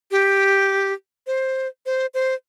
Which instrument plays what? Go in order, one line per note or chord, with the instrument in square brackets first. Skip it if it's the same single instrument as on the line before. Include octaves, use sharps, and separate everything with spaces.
[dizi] G4
C5
C5
C5